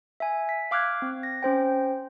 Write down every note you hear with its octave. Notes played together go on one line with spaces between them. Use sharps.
E5 G#5
B6
F5 D6 F6 F#6 G#6
C4
A#6
C#4 C5 G5